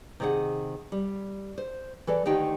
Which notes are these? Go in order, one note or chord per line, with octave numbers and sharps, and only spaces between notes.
C3 D#3 G#4 C5 F#5
G3
C5
E3 A4 D5
D2 D3 D#3 D#4 G4 G5